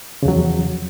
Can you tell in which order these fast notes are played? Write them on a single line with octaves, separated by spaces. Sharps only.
C#3 E2 F#3 F3